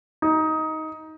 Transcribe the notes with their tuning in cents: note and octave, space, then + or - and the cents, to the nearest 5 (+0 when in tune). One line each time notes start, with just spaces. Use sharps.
D#4 +15